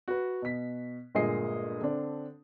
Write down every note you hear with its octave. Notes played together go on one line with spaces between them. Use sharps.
F#4 B4
B2 B6
G1 A#2 G#3 G#4 D#5 C7
D3 C4 D4